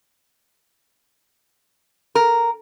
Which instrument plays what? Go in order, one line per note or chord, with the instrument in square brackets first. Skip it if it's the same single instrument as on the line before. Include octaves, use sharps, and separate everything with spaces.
[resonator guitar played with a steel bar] A#4